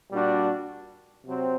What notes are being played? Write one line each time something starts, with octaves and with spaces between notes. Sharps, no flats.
A#2 G3 D4 F#4
C3 F#3 C4